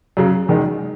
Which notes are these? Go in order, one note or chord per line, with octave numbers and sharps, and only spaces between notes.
F#2 C#3 F#3
E2 D#3 G#3 D#4